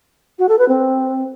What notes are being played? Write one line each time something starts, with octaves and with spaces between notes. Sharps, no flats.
F#4
A4
B4
C4